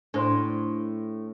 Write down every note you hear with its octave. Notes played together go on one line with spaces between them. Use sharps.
A2 D4 C5 C6